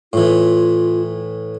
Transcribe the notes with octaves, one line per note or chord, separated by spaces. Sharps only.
A2 E3 F4